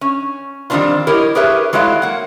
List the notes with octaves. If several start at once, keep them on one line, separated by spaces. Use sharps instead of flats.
C#4
D#3 F3 G3 C4 D4 F4
E4 G4 A#4 C#5 D#5
G4 G#4 A#4 B4 C#5 E5
F#3 G#3 A3 E4 C#5 F5
A#3 F#5